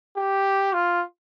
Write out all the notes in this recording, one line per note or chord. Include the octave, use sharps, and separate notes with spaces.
G4
F4